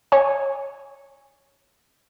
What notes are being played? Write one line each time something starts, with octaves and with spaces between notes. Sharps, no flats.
C#5 G#5